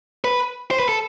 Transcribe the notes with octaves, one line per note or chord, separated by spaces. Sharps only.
B4
C5
B4
A4